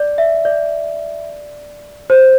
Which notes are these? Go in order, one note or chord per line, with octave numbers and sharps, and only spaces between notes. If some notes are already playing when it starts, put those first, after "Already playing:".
Already playing: D5
E5
D5
C5